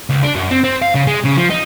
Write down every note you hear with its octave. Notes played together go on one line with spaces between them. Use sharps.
C#2
D4
F#2
C4
C4
F5
C#3
G#3
C#3
F3
D#4